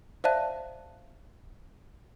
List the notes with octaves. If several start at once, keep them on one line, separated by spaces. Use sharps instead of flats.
C5 D5 E5 F5 A5 F#6